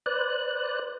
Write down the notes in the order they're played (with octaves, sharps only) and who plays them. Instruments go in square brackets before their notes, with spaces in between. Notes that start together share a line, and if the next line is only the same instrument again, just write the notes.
[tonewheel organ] B4 C5 D5 F#6